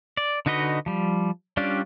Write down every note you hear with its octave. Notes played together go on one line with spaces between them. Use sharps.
D5
D3 D#4 F#4 B4 D#5
F3 G3
G3 C#4 D4 F4 G4